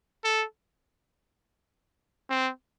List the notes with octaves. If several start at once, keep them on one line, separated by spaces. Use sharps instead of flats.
A4
C4